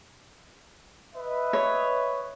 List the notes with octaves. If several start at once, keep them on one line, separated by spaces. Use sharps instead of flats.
B4 D#5 E5
C#5